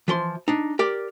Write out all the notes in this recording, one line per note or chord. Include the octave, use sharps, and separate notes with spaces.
E3 F3 C6
D4 D#4
G4 A#4 D5